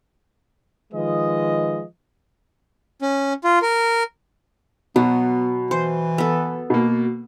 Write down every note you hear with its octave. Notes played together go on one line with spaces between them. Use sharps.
D#3 F3 G#3 F4 B4 D#5
C#4
F4
A#4
B2 F#3 B3
E3 C5
B3 A4
B2 A#3